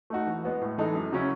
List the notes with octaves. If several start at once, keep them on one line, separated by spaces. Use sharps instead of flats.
A3 D#4 F#4
E3
G#3 B3 F#4
A2
E3 G#3 D#4 A4
F#2
C#3 F#3 C#4 E4